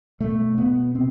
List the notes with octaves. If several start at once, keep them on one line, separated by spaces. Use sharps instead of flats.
B2 A3
B2 B3
C3 C4